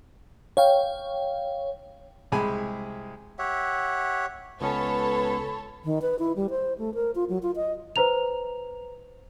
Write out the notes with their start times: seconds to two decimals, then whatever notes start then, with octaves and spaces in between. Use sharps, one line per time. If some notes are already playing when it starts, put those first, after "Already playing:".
0.57 C#5 F5 G5
2.32 C2 G#3 G#4 G#5 B5
3.39 G4 C#5 E5 F#5
4.61 C#2 B3 C#4 A4 B4 C#5 A5 B5
5.85 D#3
6.02 B4
6.19 E4
6.36 G3
6.50 C5
6.78 A3
6.94 A#4
7.15 F4
7.29 F#3
7.43 F4
7.56 D#5
7.96 B4 C5 A#5 F7